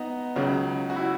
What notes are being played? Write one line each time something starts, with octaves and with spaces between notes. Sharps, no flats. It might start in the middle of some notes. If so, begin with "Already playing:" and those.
Already playing: B3 D#4
C#2 C#3 F#3
F#4
E4